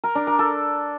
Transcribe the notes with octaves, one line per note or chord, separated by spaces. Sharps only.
A#4
D4
A#4
A4